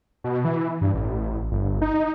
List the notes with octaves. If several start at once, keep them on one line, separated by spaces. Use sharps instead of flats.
B2
E3
G2
A1
G1
D#4